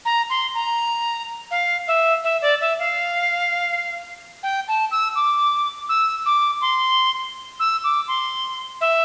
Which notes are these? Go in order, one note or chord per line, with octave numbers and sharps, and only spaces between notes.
A#5
C6
A#5
F5
E5
E5
D5
E5
F5
G5
A5
E6
D6
E6
D6
C6
E6
D6
C6
E5